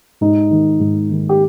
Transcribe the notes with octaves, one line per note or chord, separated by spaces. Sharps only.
G#2 D#4
D#3
G#2
D#3
G4